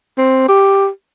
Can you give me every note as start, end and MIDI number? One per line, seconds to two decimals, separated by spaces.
0.18 0.44 60
0.48 0.87 67